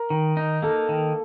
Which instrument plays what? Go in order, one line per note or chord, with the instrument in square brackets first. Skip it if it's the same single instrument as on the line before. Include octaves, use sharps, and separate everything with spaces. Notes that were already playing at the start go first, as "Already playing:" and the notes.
Already playing: [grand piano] A#4
[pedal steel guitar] D#3
D#4
[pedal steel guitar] A#3 [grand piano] A4
[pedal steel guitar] D#3